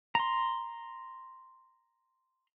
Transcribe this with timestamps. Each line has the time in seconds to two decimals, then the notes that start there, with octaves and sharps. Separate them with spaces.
0.15 A#5 C6